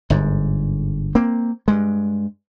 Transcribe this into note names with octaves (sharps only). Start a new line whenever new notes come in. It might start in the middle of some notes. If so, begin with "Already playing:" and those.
G1 G#2
A#3 C4
G2 G#3